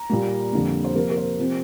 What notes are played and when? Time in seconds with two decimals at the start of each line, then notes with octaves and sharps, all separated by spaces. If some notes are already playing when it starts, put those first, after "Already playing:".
Already playing: A#5
0.10 A#2 G3 A#3
0.53 F2 D3 G3 A#3
0.85 C5
0.95 C3 F3 A#3 A#4
1.11 A#4
1.17 C5
1.39 C3 F3 C4